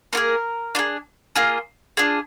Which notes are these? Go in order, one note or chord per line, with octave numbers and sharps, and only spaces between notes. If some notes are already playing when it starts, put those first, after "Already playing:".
A#3 F4 G#4 A#4
D4 F4 G#4
A#3 F4 G#4
D4 F4 G#4